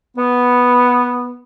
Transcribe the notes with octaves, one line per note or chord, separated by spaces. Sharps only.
B3